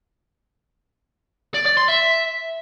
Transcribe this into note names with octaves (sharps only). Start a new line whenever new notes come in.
D5
D5
C6
E5